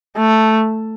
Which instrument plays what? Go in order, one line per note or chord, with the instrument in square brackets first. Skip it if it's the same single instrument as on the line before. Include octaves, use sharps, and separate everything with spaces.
[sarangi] A3